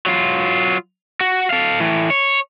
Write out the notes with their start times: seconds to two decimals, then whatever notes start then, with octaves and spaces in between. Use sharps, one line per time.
0.06 F#3 F4
1.21 F#4
1.51 A4 F5
1.80 A2 E3
2.10 C#5